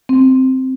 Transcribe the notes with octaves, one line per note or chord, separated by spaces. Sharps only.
C4